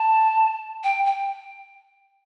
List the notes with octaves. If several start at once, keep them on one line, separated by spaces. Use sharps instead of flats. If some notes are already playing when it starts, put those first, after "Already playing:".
Already playing: A5
G5
G5